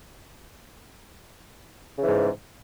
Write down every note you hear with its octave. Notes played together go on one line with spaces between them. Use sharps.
G#2 C#3 E3